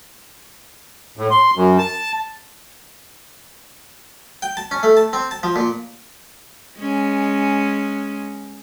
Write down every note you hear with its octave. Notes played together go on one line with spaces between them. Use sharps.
A2
C6
F#2
A5
G5
A5
C#4
A3
A5
C4
A5
F3
A#2
G#3 C#4